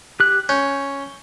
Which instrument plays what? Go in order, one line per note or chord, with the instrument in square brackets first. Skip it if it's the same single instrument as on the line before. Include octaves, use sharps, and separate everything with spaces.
[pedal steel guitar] G4 F#6
[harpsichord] C#4 [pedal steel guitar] G6